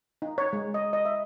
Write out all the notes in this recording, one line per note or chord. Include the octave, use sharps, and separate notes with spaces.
D#4
C#5
G#3
D#5
D#5
E5